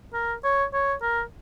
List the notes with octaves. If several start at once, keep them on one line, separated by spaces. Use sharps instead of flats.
A#4
C#5
C#5
A#4